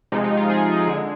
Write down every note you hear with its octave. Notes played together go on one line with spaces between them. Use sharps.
C3 F3 G#3 D#4
D#4
F4
G#4
D3 G#3